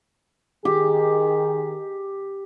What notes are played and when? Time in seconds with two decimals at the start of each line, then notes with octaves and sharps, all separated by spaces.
0.65 D#3 G4 G#4